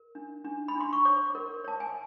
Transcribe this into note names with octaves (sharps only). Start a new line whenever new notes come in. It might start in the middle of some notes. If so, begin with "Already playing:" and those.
Already playing: A#4
D4
D4
B5
D4 C6
C#6
C#5 D6
A#4
C#5 A5
G#5